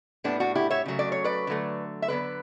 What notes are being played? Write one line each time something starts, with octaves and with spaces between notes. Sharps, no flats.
A2 G3 B3 D4
D4 F#4
E4 G4
C#5 E5
C#3 F#3 A3
D5
C#5
B4 D5
D3 F#3 A3
E5
D3 F#3 B3 B4 D5